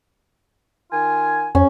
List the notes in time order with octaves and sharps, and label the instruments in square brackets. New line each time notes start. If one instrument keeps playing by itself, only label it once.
[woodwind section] D#3 F4 G#5
[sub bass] F2 [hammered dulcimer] C#4